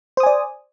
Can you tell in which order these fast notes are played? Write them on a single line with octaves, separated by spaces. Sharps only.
C5 D#6 G#5 D5